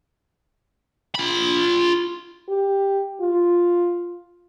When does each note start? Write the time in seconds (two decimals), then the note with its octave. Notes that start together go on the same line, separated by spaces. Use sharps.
1.15 F4 B5
2.49 G4
3.21 F4